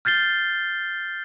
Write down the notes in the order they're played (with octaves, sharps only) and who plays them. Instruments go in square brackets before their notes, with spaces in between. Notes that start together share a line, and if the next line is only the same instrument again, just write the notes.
[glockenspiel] F6 G6 A6 C7 G7